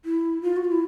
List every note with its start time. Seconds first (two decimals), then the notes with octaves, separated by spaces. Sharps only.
0.04 E4
0.41 F4
0.57 F#4
0.64 F4
0.71 E4